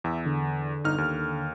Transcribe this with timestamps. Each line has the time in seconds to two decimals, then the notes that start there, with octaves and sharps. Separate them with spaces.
0.04 E2 E5
0.26 D3
0.84 G1 D#4 F6
0.98 D#2